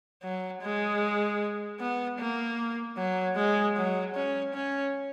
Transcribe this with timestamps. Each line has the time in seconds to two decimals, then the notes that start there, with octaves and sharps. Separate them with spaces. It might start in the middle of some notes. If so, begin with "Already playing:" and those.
0.23 F#3
0.62 G#3
1.80 B3
2.19 A#3
2.97 F#3
3.37 G#3
3.76 F#3
4.15 C#4
4.54 C#4